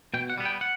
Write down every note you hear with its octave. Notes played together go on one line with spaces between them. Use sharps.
B2 G5
F#5
G3 B3
G5
F#5